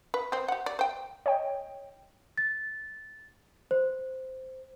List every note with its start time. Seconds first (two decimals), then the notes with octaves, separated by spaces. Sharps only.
0.14 B4
0.32 C4 C5
0.48 G4 F#5
0.66 D5
0.79 C5 G5
1.26 C#5 D#5 G5
2.38 A6
3.71 C5